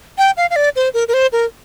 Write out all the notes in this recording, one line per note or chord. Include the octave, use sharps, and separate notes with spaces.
G5
F5
F5
D5
C5
A#4
A#4
C5
A#4